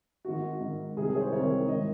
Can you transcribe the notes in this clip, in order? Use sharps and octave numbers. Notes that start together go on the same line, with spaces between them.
G#1 G#2 D#3 F#4
G#1 G#2 D#3
C2 C3 D#3 G#4
G#4
C#5
C5
C2 C3 D#3 C#5
G#1 D#3 D#5